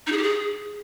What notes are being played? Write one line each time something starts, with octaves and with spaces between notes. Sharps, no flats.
D#4
G#4
G4
G#4